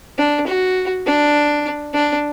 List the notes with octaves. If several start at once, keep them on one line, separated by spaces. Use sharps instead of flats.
D4
F#4
D4
D4